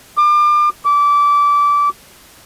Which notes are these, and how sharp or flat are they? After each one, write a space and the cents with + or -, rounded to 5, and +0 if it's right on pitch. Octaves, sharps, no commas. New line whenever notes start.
D6 +35
D6 -20